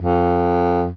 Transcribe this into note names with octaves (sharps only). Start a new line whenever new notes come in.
F2